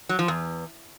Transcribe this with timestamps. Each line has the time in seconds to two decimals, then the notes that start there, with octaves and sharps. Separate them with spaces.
0.09 F#3
0.19 F3
0.28 E2